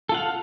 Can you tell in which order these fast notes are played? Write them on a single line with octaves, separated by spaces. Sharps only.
A4 F4 F#5 F5